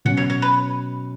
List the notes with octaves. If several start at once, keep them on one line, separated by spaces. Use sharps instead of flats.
B2 F#3 C#4 F#4 F#5
C#5
C#5
B4